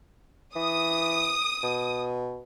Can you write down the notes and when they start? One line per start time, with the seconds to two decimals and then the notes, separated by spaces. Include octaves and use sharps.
0.56 E3 D#6
1.63 B2